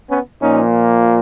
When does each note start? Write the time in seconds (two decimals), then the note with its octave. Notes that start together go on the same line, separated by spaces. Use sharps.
0.10 B3 C#4
0.41 A#2 F3 A#3 C#4 D#4